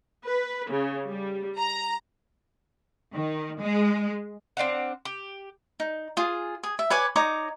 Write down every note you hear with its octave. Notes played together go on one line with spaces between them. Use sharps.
B4
C#3
G3
A#5
D#3
G#3
C4 D4 F5 F#5
G4
D#4
F4 G#4
G#4
E5
B4 C#5 G#5 D6
D#4 C#5 A#5 D6